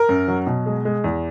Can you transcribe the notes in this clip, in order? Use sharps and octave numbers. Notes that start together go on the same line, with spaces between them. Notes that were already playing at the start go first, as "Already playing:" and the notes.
Already playing: A#4
F#2
F#3
B2
G#3
G#3
E2